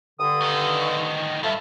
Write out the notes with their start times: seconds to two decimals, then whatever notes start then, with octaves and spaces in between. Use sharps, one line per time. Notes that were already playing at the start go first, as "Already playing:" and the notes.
0.20 G2 D3 D#6
0.41 D2 D#3
0.80 D#5
1.43 G2 F4 A4 E5 A5